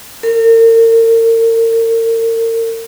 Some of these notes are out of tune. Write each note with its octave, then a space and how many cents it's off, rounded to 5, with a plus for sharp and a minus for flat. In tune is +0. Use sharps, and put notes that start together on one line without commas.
A#4 -40